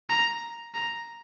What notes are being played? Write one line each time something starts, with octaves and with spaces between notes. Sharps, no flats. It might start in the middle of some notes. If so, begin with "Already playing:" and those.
A#5
A#5